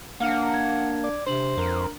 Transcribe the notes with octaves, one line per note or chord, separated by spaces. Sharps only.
A#3 D4 F5 F#5 F6 C#7
G#6
D5
C3 D4 C5 F#7
F2 A#4